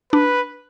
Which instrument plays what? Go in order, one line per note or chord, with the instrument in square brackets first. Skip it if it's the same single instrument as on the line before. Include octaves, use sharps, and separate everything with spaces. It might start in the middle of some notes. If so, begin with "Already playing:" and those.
[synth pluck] D4 [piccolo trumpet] B4